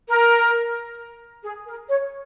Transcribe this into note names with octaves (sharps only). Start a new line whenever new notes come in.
A#4
G#4
A#4
C#5